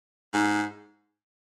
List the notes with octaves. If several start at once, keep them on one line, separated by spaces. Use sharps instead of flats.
G#2